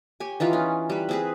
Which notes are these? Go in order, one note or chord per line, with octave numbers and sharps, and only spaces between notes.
G4 C#5 G#5
E3 D#4 F4 B4
C#4
G3 B4
C4 G#4 B4